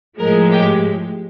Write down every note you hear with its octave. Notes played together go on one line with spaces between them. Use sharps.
A2 F3 G#3 A#4
G4